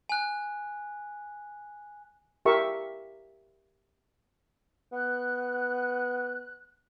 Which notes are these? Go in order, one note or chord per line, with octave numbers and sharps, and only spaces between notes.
G#5 F#6
G4 A#4 E5 C#6
B3 F#6